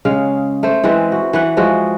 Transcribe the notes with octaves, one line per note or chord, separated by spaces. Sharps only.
C#3 G#3 F5
A3 C5
E3 G#3 C4 B4
F#4
E3 B4 F#5
F3 G#3 F#4